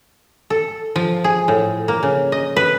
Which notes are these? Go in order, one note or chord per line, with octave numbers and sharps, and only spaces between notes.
A4
F3
G#4
A2
A#3
C#3
D#5
B4